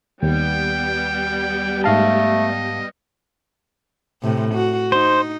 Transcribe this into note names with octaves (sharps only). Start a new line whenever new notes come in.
D#2 G3 B3 G5
G#2 A3 D#5 F5 A5
A2 C3
F#4
D#4 C5